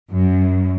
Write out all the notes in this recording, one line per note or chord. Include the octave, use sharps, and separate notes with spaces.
F#2